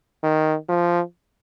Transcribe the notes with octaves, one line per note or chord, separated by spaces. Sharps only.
D#3
F3